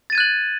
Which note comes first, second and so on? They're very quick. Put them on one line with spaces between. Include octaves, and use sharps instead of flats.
A6 D#7 G#6 F#6 F#7